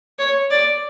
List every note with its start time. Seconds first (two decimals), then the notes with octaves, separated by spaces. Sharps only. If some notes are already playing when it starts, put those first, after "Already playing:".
0.19 C#5
0.51 D5